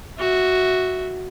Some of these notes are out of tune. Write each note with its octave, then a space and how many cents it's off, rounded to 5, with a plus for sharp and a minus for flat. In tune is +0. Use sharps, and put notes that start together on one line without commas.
F#4 +0 E5 -10